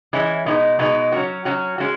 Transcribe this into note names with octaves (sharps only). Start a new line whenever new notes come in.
E3 G#3 C#4 E4
B2 G#3 B3 D#4
B2 G#3 B3 D#4
F#3 C#4 F#4
F#3 C#4 F#4
G#3 C#4 F#4